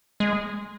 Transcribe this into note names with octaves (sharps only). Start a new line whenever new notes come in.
G#3